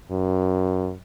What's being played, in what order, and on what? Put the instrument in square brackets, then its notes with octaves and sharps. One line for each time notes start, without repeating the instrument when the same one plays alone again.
[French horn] F#2